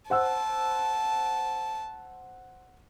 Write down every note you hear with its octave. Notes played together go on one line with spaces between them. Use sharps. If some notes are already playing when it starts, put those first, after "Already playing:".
C5 F#5 A5 E6